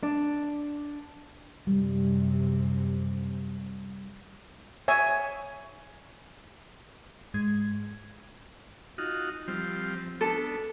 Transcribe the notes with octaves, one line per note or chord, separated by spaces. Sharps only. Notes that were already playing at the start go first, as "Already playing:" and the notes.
D4
F#2 C3 G3
C#5 E5 G#5
G#2 G#3 G#6
D#4 F4 F#4
F3 G3 C4
B3 D4 A4